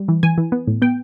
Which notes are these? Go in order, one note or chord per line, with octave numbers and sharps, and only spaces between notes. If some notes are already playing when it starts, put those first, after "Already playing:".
Already playing: G3
E3
E3 G#5
E3
B3
A2
B3 G5